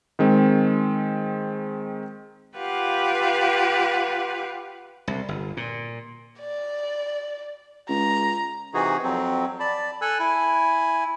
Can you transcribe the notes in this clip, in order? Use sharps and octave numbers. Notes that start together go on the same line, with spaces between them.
D#3 G#3 C4
F4 G4 B4 F5 F#5
C2
G1
A#2
D5
C#2 A#5
C3 E3 D#4 F#4 G#4
F2 F#3 C4
D5 A5 B5
A4 G#5 E6 F#6
E4 G#5